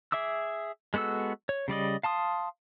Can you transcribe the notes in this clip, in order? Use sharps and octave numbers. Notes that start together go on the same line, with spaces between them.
G#4 E5 D6 E6
G#3 B3 F#4 A4 E6
C#5
C#3 G3 D5 D#5
F5 A5 C6 D#6